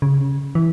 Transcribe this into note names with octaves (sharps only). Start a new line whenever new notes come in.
C#3
E3